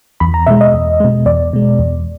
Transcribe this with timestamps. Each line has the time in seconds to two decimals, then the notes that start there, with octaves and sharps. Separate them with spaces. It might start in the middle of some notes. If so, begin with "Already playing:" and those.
0.20 E2 B5
0.34 A#5
0.46 B2 G#3 E5
0.61 D#5
0.74 E2
1.00 B2 G#3
1.26 E2 D5
1.53 B2 G#3
1.79 E2